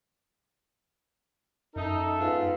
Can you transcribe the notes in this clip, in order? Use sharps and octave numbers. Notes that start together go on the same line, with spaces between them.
F#2 D#4 A4 E5
G#2 B3 F4